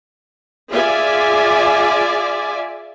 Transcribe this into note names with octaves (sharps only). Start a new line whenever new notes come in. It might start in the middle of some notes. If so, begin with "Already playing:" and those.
F4 G#4 D5 E5 G#5